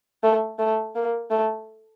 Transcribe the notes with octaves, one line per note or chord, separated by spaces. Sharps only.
A3
A3
A#3
A3